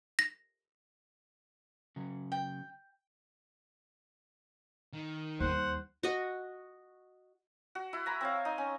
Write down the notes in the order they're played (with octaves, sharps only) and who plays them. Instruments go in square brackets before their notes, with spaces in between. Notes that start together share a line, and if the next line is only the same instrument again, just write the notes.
[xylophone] A#6
[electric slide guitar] C#3 F#3
[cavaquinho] G5
[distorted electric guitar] D#3
[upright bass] D#2 G3 [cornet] C5 [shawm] F#5
[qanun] F#4 D#5
[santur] F#4
E4
G#5 A#5 B5
C4 C#5 F5
D#4
C#4